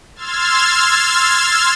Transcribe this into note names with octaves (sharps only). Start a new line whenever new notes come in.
C6 E6 F6 G#6 A6